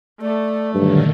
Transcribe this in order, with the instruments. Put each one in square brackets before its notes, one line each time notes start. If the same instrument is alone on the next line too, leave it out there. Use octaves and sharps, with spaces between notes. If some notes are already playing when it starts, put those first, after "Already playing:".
[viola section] A3 [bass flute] D5
[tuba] G2 [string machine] A#2 D3 D#3 [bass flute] F#3